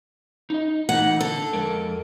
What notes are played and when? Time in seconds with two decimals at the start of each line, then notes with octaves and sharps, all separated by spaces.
0.50 D#4 D#5
0.89 E3 A3 D#4 F#5
1.21 D3 A4
1.53 F2 G#3 A#4